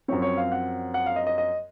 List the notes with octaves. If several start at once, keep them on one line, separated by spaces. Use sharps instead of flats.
F#2 F3 C4 C#5
C#5
F5
F#5
F#5
F5
D#5
D#5
D#5